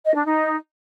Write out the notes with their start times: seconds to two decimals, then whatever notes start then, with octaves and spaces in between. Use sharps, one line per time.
0.05 D#5
0.15 D4
0.25 D#4